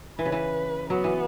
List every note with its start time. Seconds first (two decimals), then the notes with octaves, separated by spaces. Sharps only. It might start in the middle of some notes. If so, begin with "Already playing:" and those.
0.19 E3 B4
0.26 C#3
0.32 E3
0.90 F#3 B3
1.04 E3